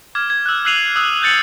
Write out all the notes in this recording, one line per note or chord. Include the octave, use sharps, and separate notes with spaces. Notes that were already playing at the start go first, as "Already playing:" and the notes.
D6 F6 G#6
G#6
E6 F#6
E6 F#6 C7 D#7 F7 F#7
D#6 E6 F#6
F#6 G6 A6 C#7 F#7